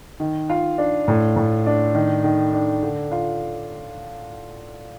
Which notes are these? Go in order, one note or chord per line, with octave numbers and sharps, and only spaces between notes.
D#3
F4
D4
A2
A2
D4
D#3
D#3
D4
D3
F4